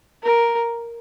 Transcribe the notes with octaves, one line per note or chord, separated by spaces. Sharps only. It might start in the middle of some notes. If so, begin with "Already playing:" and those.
A#4